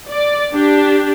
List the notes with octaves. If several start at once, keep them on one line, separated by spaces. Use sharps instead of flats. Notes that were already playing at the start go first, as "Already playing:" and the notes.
D5
D4 G4